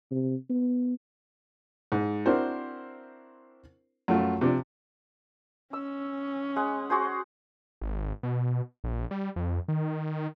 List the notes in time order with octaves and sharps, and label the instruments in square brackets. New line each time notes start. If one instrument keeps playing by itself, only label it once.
[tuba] C3
B3
[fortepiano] G#2
C4 D4 E4 F#4 A#4 C5
F#2 F3 A3 F4
C3 F3 D4 D5
[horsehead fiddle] C#4 [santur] E6
[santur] G#3 F#5
F#4 G#4 C5
[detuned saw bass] G#1
B2
A#1
G3
F2
D#3